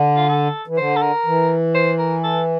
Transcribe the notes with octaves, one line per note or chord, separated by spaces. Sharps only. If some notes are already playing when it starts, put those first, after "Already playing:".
Already playing: D3
F4
A4
E3
D3 C5
A4
A#4
E3
C5
A#4
A4